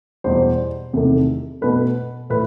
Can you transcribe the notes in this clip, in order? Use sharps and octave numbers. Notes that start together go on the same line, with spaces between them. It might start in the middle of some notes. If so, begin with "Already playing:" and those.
E2 B2 G3 C5
E2 C3 D#3 A3
B2 A3 B4
A2 B4